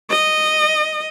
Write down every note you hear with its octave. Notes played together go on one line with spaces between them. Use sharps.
D#5